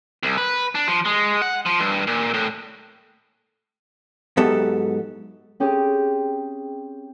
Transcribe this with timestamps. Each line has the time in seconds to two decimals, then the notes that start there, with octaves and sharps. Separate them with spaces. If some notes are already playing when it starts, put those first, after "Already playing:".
0.23 C2
0.38 B4
0.75 D4
0.88 F3
1.05 G#3
1.42 F#5
1.66 F3
1.80 G2
2.07 A#2
2.34 A2
4.37 G#2 F#3 B3 G4 A4 E5
5.60 C4 C#4 G4 G#4